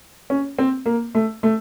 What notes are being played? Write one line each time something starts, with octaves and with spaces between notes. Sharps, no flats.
C#4
C4
A#3
A3
A3